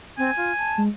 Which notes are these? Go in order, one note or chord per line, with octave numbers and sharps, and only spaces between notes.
C4 G#5
F4
A5
G#3